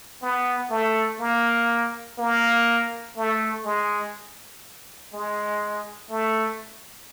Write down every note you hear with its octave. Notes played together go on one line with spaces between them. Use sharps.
B3
A3
A#3
A#3
A3
G#3
G#3
A3